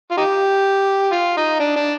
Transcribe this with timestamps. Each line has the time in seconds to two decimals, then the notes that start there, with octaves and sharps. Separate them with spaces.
0.11 F4
0.17 D#4 G4
1.12 F4
1.37 D#4
1.60 D4
1.76 D4